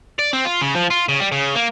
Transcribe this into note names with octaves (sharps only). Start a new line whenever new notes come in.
D5
C4
F4
C#3
F3
F4
C#3
G3
C#3
A#3